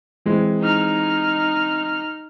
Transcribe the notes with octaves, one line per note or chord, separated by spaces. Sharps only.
E3 G#3 C4
D#4 F6